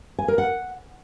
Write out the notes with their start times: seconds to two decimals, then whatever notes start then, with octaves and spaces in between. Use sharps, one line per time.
0.19 G#5
0.28 A#4
0.38 F#5